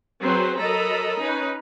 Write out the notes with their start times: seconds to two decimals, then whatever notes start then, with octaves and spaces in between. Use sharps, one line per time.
0.21 F#3 C4 G#4 B4 C5
0.59 F#3 A4 A#4 D#5 A#5 B5
1.20 C#4 D#4 B4